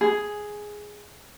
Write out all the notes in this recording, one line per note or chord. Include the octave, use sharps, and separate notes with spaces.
G#4